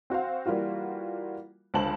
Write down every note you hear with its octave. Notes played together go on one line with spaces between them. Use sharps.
C4 F#4 C5 F5
E3 G3 A#3 F4 F#4
C#2 D3 C5 A5 F#7